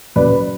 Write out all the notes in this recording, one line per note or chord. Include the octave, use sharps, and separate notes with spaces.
F#2 C#3 F#3 C#4 B4 D5